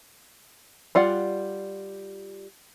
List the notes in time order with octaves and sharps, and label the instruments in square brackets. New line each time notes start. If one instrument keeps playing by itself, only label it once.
[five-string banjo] G3 F4 D5 F#5